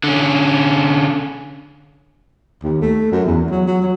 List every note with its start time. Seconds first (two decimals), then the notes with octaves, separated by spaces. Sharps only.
0.04 D3 C#4
2.63 D#2
2.81 A3
3.12 F#2
3.26 E2
3.50 F#3
3.67 F#3
3.82 F#3